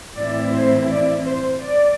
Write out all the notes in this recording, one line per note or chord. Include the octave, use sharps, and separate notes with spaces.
A2 E3 C4 E4 D5
C5
D5
C5
D5